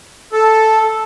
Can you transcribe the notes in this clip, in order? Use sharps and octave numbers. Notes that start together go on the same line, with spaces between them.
A4